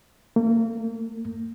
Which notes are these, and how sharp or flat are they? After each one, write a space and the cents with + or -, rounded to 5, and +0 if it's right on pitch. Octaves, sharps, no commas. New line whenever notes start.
A#3 -35